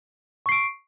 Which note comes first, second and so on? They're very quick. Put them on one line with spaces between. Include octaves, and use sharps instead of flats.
C#6 C7 D7